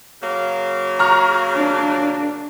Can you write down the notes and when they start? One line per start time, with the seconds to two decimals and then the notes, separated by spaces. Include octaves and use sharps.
0.22 C#3 F#3 A#3
0.99 A#5 C#6 F6
1.55 D4